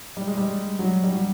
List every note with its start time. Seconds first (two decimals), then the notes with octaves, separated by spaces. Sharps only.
0.17 G3
0.28 G#3
0.38 G3
0.79 F#3
1.04 G3
1.12 F#3